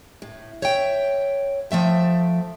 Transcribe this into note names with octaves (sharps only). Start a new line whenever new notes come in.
A2
C#5 E5 G5
F3 A3 E5 G5